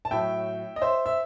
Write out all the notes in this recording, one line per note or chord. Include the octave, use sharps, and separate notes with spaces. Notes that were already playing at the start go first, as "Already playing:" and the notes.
A5
A2 F#3 E5 G5
D#5
C5 E5
E5